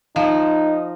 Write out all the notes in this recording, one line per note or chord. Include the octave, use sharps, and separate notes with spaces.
F3 D#4